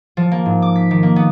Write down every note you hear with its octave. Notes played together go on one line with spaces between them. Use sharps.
F3
A#3
G#2
D6
B6
D#3
A#3
B3